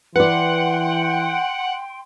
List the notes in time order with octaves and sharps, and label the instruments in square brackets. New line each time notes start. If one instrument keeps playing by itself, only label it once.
[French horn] E3 [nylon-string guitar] B4 D5 [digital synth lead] F#5 [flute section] G5 C6